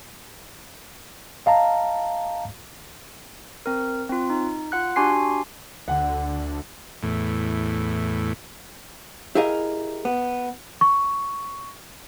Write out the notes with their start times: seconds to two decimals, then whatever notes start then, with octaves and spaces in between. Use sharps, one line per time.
1.46 D#5 F5 A5 A#5
3.66 C4 A#4
4.09 C4 F4
4.30 D#4
4.72 F4 F#5 F#6
4.96 D4 F#4 G4 G#5 C6 C7
5.88 D2 D3 F#5
7.03 E2 A2
9.35 E4 G4 G#4 A#4 D#5 F5
10.05 B3
10.81 C#6